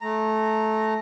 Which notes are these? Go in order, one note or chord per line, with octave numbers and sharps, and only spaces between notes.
A3 A#5